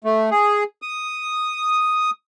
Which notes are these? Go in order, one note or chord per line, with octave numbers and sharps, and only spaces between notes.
A3
G#4
D#6